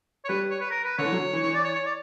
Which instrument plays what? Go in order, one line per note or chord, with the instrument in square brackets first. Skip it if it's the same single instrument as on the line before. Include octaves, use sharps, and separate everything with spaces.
[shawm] C#5
[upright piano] G3 [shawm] B4
[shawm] C#5
B4
A#4
B4
[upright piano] D3 [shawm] C#5
[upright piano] E3
F#3
E3
E3
[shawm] D5
C#5
C#5
D5